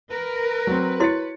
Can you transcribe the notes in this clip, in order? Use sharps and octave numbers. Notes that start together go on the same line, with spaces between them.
A#4 B4
F#3 C4
E4 F#4 C#5 C6 A6 C#7